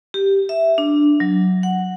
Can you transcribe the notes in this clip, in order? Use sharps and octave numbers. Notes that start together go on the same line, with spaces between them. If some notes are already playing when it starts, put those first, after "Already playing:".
G4
E5
D4
F#3
F#5